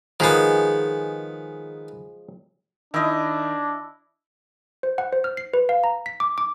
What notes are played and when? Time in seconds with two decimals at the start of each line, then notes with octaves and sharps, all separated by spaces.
0.20 D#3 F3 G#3 B3 G#4
2.94 D#3 D4 E4 D#5
4.83 C5
4.98 F#5
5.13 C5
5.24 F6
5.37 C7
5.54 B4
5.69 F5
5.84 A#5
6.06 B6
6.20 D6
6.38 D6